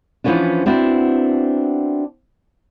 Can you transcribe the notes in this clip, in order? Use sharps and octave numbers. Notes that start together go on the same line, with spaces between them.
E3 F3 G#3 B3 C#4 D4
B3 C4 D4 E4 F#4